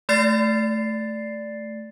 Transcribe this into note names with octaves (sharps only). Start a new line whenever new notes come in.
A3 D5 A6 C7